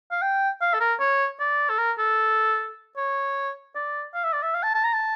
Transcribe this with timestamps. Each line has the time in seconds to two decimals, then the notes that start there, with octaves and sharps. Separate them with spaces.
0.11 F5
0.22 G5
0.61 F5
0.74 A4
0.80 A#4
1.00 C#5
1.40 D5
1.69 A4
1.78 A#4
1.98 A4
2.96 C#5
3.75 D5
4.14 F5
4.24 E5
4.33 D5
4.42 E5
4.54 F5
4.63 A5
4.74 A5
4.84 A#5
4.93 A5